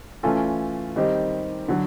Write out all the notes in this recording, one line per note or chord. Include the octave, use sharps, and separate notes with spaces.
E3 A3 C#4 F4 A4
D#3 G3 C4 D#4 G4
D3 F#3